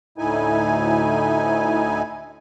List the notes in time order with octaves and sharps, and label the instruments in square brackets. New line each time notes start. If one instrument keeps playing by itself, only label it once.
[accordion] D2 A2 D#4 E4 G#5